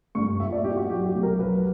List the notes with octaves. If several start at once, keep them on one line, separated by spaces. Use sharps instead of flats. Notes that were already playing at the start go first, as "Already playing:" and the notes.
G2 C#6
A#2 E5
D5
C#4 G4
F#4
F#3 G4
G4
B1
A#4
F#3 B4